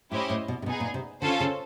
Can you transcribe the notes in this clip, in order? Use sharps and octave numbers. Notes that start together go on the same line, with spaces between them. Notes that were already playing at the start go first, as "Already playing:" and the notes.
A2 C#4 E4 G4 C5 D#5
A2
B2
C3
B2 B3 D#4 G#4
A#2
C3
D3 C#4 F4 A4 C5
C#3